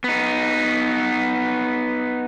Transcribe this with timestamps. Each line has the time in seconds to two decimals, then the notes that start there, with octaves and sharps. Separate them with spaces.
0.04 B3 D#4